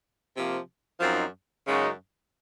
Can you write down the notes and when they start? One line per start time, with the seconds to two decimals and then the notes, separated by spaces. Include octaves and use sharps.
0.34 C3 F3 A#3
1.00 F#2 F3 C4 D#4
1.67 F#2 C#3 G#3 D#4 F#4